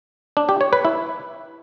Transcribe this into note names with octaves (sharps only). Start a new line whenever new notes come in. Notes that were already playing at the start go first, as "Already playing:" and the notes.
D4
G4
C#5
B4
E4